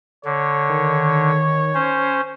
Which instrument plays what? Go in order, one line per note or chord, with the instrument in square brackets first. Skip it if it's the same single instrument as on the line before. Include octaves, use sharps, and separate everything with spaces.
[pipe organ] D3 [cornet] C#5
[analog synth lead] D#3
[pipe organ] C#4 C5